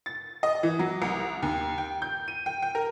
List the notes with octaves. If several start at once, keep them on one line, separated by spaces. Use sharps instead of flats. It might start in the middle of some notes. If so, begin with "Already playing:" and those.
A6
D#5
E3
F#3
C2
D#2
G5
G6
D#7
G5
G5
A#4